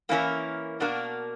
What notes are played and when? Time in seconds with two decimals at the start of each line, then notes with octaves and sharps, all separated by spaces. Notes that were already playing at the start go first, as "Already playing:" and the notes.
0.09 E3 A#3 C#4 E4 A#4
0.80 B2 A#3 D4 F#4 A#4